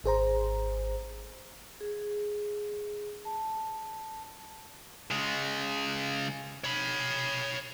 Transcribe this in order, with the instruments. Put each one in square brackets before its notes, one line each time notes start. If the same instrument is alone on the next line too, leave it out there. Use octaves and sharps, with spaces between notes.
[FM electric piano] G#1 G#4 C5 A#5
[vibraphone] G#4
A5
[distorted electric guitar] C#3 G#3
C#5 B5